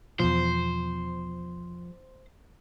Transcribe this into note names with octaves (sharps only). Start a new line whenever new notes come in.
E2 B2 F3 C5